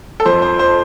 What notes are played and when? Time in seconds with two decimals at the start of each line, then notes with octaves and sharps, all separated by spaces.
0.20 A4
0.25 F2 F3 C5
0.42 C5
0.59 C5